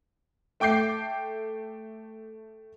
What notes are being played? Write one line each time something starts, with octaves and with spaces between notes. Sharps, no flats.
A3 G5 D6 G6 C7